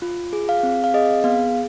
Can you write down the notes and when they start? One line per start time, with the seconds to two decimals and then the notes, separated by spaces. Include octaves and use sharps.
0.02 F4
0.33 G#4
0.49 F5
0.63 C4
0.84 F5
0.94 G#4 D#5
1.24 B3 F5